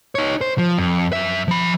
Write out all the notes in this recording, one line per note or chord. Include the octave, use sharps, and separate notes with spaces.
D#4 C#5
C5
F3
F2
F#2 E5
F3 B5